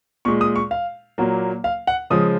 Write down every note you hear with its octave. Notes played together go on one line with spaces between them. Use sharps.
A#2 G#3 C#6
D#6
C#6
F5
A#2 F#3 A#3
F5
F#5
C#3 F3 G#3 D#6